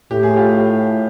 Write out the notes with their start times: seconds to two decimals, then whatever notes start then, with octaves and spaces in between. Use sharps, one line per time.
0.11 A2 G4
0.23 G#4
0.36 F4 G4